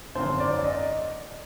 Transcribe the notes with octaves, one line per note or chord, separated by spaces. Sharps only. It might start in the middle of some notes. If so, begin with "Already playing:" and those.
G#1 F#2 D3 C5
D5
D5
D#5